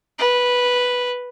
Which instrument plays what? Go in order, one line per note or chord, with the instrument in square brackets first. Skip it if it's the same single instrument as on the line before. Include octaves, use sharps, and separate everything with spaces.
[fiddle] B4